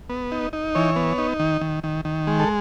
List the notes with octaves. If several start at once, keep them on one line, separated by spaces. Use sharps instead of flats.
B3
D#4
D#4
E3 C#5
B3
D#4
D#3
D#3
D#3
D#3
G#3
A4